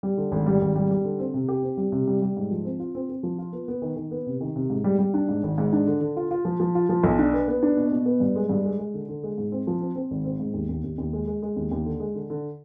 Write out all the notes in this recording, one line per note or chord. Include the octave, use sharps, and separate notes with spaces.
G3
D3
G#1
G3
G#1
G3
G3
D3
C4
C3
G4
C4
G3
C3
G3
G3
G#2
F3
C4
F4
C4
C4
F3
F4
B3
B3
D#3
D#3
B3
C3
D#3
C3
G#2
G3
G3
D4
G#2
G#1
G#2
D4
D3
D3
F4
F4
F3
F3
F4
F3
B1
D4
B3
B3
D4
B2
B2
B3
G2
G#3
G2
G#3
G#3
D3
D3
G#3
G#2
C4
F3
C4
C4
G#1
C4
G#2
D#2
D#2
D#2
D#2
G#3
G#3
G#3
D#2
D#2
D3
G#3
D3
D3